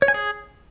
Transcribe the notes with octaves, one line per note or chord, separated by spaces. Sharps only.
C#5
G#5
G#4